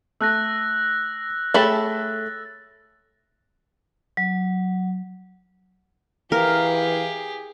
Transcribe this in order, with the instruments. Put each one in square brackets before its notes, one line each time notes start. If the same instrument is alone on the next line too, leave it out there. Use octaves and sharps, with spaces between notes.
[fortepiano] A3 [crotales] E6 F#6 A#6
[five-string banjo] A3 A4 B5 [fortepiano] G#4 C#5 G5 [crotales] A6
[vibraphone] F#3
[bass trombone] E3 [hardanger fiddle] G4 G#4 [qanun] A#4 [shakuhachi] F5